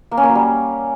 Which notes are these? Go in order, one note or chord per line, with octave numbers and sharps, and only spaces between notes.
A#3
C#4
A#3
F#3
G3